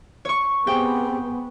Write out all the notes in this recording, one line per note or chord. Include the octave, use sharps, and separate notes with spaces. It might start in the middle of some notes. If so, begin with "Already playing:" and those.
C#5 C#6
B3 C4 G4 G#4 G5